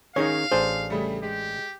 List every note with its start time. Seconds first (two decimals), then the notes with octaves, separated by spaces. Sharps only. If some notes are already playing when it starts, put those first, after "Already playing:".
0.16 D#3 C#4 D#4 G#4 C#5 F5
0.52 A1 D4 G#4 C5
0.90 C#3 G3 A3
1.23 G#3 G4